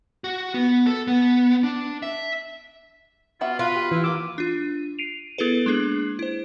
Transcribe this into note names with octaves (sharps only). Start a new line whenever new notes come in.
F#4
B3
A4
B3
D4
E5
B3 F4 F#4 E5
F4 B4
G4
E3 E4
A#3 F4 D6 E6
D4 F4
C7 D7 D#7 F7
B3 E4 G#4 A4 B4
G#3 A#3 D4 G#4
E4 C5